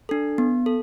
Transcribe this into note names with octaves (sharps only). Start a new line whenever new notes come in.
D4 A4
B3
A4